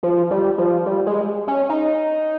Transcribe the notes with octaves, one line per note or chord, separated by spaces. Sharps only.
F3
G3
F3
G3
G#3
C#4
D#4